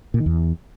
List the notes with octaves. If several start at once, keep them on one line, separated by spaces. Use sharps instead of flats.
A#2
D#3
E2